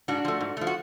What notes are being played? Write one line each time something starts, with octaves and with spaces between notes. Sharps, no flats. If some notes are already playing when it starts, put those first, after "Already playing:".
G#2 D4 F#4
F3 A3
G#2
F3 A3
F#4